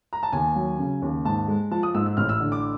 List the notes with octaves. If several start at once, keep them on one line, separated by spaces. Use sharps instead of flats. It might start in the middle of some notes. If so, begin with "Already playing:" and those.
A#5
A5
D#2 G#5
F#3
C#3
D#2
G#2 A5
G#3
F3 A5
D#6
G#2 E6
E6
A1 F6
E6
D3
D6